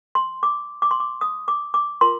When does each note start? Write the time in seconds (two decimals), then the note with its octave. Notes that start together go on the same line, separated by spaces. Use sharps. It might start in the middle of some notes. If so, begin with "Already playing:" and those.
0.15 C6
0.43 D6
0.82 D6
0.91 C6
1.00 D6
1.21 D#6
1.48 D6
1.74 D6
2.01 F4 A#4 C6